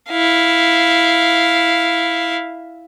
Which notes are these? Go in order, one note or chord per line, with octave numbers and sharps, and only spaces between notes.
E4 F5